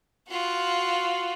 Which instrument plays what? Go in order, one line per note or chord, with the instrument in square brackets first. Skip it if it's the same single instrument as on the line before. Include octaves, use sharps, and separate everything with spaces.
[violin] F4 F#4